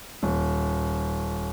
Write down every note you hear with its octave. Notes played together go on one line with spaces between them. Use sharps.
D#1